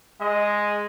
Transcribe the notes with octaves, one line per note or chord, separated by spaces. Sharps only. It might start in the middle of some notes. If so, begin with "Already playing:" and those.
G#3 D#5